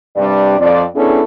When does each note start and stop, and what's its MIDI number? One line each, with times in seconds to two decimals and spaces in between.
0.16 0.57 43
0.16 0.57 48
0.16 0.57 55
0.16 0.57 62
0.16 0.57 74
0.60 0.83 41
0.60 0.83 74
0.95 1.21 59
0.95 1.21 61
0.95 1.21 62
0.95 1.21 64
0.95 1.21 68
0.95 1.21 69